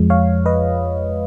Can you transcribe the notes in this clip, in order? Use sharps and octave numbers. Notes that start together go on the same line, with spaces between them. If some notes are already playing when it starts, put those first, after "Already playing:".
Already playing: F2 F3 G#3
C#5 F5
B4 D#5